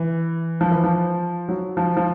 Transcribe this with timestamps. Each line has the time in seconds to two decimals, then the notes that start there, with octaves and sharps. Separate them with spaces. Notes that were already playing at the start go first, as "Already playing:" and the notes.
Already playing: E3
0.61 F3
0.71 E3
0.84 F3
1.49 F#3
1.77 F3
1.97 F3